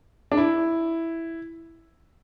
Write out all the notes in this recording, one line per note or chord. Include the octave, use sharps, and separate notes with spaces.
D4
E4